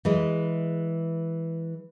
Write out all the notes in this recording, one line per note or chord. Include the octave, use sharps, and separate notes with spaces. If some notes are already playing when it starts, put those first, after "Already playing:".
E3 G#3